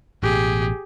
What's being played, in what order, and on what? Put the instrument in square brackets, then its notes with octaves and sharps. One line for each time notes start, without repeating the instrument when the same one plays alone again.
[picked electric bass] A1 B2 [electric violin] G4 G#4